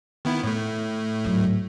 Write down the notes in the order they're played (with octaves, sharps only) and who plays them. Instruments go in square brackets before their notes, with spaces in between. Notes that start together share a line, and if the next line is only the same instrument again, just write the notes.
[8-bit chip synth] D#3 B3 E4
A2 A3
[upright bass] G#2 F#3